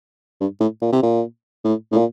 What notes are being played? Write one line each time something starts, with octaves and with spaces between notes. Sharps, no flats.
G2
A2
A#2
C3
A#2
A2
A2
A#2